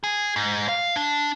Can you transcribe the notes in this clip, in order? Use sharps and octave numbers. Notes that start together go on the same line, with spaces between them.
G#4
G#2
F5
D4